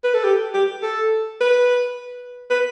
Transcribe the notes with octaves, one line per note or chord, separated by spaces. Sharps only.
B4
A4
G4
G4
A4
B4
B4